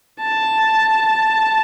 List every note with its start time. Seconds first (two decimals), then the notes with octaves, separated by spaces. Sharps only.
0.20 A5